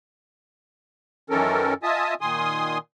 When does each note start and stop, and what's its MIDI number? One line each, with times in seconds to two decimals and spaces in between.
1.30 1.74 42
1.30 1.74 51
1.30 1.74 52
1.30 1.74 61
1.30 1.74 69
1.30 1.74 70
1.83 2.14 65
1.83 2.14 75
1.83 2.14 76
1.83 2.14 80
1.83 2.14 81
1.83 2.14 87
2.21 2.78 46
2.21 2.78 51
2.21 2.78 80
2.21 2.78 84
2.21 2.78 87